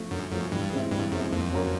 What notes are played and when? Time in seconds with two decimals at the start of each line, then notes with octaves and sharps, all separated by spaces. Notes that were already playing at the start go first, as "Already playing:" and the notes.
Already playing: F3 A3
0.11 F#2 D3
0.32 F#2 F3 A3
0.52 G2 E3
0.72 G#3 C4 E4
0.91 G2 E3
1.11 F#2 G#3 C4 E4
1.32 F2 A#3
1.51 C#4 F#4 A#4 C#5